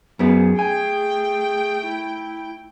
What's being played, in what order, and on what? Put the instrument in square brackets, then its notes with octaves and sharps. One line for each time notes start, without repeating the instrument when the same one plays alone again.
[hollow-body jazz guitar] F#2 B3 [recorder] G#4
[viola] A3 G5 [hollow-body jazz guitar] G#5
[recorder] E4